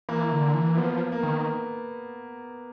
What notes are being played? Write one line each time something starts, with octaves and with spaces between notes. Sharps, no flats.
E3 A#3
D3
E3
F3 B3
A#3
D#3